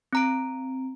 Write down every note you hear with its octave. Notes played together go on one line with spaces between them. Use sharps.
C4 A#5 D7